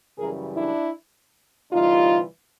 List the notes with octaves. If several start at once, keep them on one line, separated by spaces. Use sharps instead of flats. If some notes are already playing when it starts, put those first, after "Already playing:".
F#2 C#3 E3 G3 G#4 A#4
D4 E4
D2 C3 E3 G3 D#4 F4